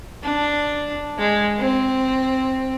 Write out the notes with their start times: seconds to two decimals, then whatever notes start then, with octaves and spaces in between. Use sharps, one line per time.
0.23 D4
1.18 G#3
1.59 C4